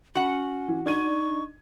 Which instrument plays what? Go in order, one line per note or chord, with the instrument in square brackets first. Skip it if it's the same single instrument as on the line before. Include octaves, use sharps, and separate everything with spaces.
[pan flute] C#4 [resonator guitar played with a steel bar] F#4 F#5
[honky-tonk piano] E3
[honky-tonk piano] D4 G#6 D#7 [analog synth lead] D#4 [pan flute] C#6